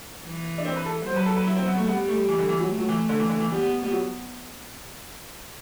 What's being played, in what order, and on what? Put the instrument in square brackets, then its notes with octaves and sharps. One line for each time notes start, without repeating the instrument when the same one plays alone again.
[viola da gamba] E3
[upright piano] D4
C4
B4
A4
[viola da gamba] F#3 [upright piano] C5
[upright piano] B4
A4
B4
E4
C4
B3
A3
[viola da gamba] G3 [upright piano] B3
[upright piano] A3
E3
D3
E3
F#3
[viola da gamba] A3
[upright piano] F#3
E3
D3
E3
D3
E3
[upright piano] G3 [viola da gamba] B3
[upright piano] G3
F#3